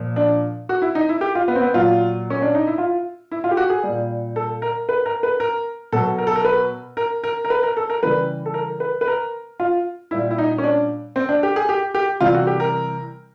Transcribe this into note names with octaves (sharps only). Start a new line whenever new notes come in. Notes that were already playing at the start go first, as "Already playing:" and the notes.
Already playing: A#2 F3
D4
F#4
E4
D#4
E4
G4
F4
B3
C4
B3
A#2 F#3 F4
C#4
D4
D#4
E4
F4
E4
F4
G4
F#4
G#4
A#2 G3
A4
A#4
B4
A#4
B4
A#4
B2 F#3 A4
A#4
A4
A#4
B4
A#4
A#4
A#4
B4
A#4
A4
A#4
C#3 E3 G3 B4
A4
A#4
B4
B4
A#4
F4
A#2 G3 E4
E4
D#4
C#4
D4
C4
D4
G4
G#4
G4
G4
C3 E3 G3 F4
F#4
G4
A#4